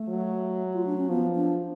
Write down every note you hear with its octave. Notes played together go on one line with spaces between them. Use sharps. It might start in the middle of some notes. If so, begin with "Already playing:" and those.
Already playing: A3
F#3
F4
D4
C#4
F3 B3
D4